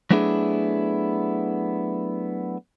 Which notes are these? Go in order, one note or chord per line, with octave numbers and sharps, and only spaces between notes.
F#3 A3 B3 D4 E4 G#4